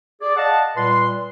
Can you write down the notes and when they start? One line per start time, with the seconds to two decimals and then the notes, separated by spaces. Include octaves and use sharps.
0.22 G#4 D5
0.37 D#5 F5 F#5 A5
0.77 A#2 G3 B4 C6